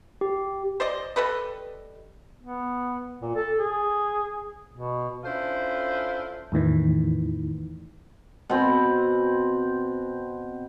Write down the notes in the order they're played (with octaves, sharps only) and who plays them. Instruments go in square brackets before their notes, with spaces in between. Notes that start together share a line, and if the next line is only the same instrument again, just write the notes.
[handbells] G4
[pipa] C5 D5 D#5
G3 A4 B4 D#5
[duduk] B3
A#2
A4
G#4
B2
[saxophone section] C#4 D4 E4 F4 A4 C5
[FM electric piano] E2 A2 D#3 E3
[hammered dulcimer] B2 C4